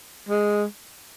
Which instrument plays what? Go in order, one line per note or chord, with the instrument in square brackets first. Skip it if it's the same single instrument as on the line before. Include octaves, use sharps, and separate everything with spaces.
[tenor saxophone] G#3